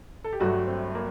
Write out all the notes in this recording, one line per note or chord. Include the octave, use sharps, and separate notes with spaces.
A4
G4
G1 G2 F#3 A3 F#4
C4
A#3